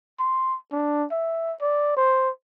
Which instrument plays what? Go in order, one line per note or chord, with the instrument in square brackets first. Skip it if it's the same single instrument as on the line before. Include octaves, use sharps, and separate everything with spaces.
[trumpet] C6
D4
E5
D5
C5